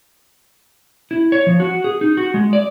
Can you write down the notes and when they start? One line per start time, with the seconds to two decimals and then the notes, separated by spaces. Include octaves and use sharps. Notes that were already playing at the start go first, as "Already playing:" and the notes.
1.11 E4
1.32 C#5
1.47 F3
1.60 F#4
1.84 G#4
2.01 D#4
2.17 F#4
2.34 G#3
2.53 D5